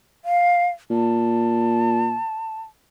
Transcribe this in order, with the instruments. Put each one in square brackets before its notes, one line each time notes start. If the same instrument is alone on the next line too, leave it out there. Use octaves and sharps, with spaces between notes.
[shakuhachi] F5
[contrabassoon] A#2 [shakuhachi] A5